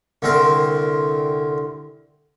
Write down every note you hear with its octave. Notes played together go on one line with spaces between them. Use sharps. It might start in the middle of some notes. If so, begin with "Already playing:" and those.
C2 D3 C4 A#4